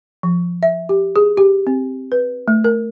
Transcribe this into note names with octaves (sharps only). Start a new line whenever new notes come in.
F3
E5
G4
G#4
G4
C4
B4
A3
A#4